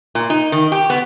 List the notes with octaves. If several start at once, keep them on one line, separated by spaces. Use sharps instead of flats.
A#2
D#4
D#3
G4
B3